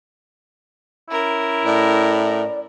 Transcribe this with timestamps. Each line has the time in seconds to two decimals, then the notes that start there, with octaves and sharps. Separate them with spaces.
1.10 C#4 E4 A#4
1.65 A2 D5